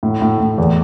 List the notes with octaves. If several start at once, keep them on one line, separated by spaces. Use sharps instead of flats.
A2
A2
A2
E2